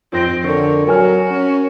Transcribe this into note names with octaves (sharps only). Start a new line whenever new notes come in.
F2 C4 A#6 D7
D3 A#4 C#5
F#3 F#4 A#4 G#5 F6
C#4